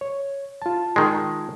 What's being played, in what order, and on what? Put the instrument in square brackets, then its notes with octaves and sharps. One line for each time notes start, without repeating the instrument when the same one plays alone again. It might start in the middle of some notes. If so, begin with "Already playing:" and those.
[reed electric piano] C#5
F4 A5
[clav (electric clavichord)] D#3 G#3